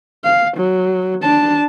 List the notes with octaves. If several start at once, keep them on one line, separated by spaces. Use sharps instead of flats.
F5
F#3
D4 A5